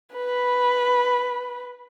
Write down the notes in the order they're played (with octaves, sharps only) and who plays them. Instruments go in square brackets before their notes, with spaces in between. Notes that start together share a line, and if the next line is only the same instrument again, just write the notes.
[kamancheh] B4 B5